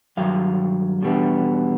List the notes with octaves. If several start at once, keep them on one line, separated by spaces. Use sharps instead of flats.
G2 D#3 F#3 F5
E2 B2 G3 B3 D4